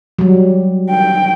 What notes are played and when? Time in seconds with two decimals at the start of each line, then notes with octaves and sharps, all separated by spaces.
0.19 F#3 G3
0.90 G5